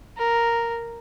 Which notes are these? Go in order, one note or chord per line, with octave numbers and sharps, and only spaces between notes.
A#4